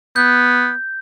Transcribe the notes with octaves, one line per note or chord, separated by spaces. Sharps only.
B3 G6